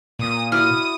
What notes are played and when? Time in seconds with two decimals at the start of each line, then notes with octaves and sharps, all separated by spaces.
0.19 A#2 D#6
0.52 E4 F#4 D5 D#6 F6